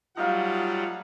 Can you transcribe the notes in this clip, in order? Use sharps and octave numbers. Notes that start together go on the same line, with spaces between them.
F#3 G3 A3 D#4 F4 F5 F#5